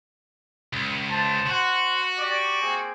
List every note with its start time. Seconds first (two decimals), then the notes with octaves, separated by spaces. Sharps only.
0.73 C#2
1.09 C5 A5
1.47 F#4 C5 F#5
2.17 G4 D5
2.60 A#3 C4 G#4